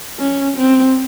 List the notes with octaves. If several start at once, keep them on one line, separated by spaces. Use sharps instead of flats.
C#4
C4